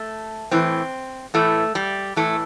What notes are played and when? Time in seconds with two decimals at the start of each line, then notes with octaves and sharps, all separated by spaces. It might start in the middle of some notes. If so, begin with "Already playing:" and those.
Already playing: A3
0.51 A2 E3 C4
1.34 A2 E3 A3
1.75 G3
2.16 A2 E3 A3